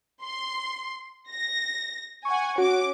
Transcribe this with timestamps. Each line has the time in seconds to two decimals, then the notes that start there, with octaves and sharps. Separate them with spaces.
0.23 C6
1.31 A#6
2.25 F#5 G#5 C#6
2.58 C#4 F#4 D6